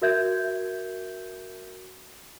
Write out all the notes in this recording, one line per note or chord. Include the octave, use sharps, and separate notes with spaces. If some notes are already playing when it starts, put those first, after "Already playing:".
F#4 A#4 E5 G6 G#6